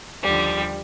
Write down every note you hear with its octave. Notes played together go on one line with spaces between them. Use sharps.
D#2 D3 F3 G3 G4